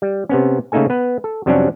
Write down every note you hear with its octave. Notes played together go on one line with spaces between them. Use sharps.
G3
C3 B3 C#4
C#3 A3 A#3 D#4 A4 G#5
B3 B4
A4
F2 C3 F#3 G3 C#4 D4